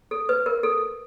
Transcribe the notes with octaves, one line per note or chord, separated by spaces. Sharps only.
A4
B4
A#4
A4